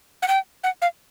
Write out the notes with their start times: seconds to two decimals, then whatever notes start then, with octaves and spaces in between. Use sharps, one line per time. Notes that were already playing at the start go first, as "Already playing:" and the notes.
0.22 F#5
0.28 G5
0.64 F#5
0.82 F5